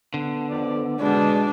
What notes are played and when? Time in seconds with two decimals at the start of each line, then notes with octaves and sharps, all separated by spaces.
0.14 D3 B3
0.50 F2 D5
1.01 B2 G#3 D4